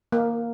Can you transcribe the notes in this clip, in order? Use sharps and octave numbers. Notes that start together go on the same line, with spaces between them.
A#3